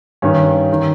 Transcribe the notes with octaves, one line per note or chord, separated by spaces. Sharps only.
G2 D#3 C#4
D#3